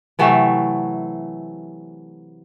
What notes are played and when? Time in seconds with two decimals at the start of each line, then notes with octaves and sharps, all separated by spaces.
0.19 C3 E3 F#3 A3